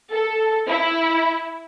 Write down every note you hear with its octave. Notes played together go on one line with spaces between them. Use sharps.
A4
E4